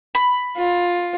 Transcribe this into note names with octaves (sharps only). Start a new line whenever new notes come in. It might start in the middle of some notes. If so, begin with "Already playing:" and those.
B5
F4